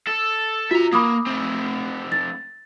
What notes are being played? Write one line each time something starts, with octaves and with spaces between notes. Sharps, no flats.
A4
F4 F#4 E5 A#5
A#3 B5 D6 D#6
A3 C4
A6